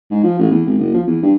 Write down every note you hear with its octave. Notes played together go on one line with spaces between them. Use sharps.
G#2
F3
A1
E2
G#1
F#1
F3
E2
G2